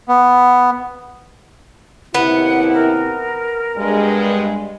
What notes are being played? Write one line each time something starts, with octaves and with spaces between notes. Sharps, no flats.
B3
D#2 C3 B3 E4 F#5
A#4
G2 G#3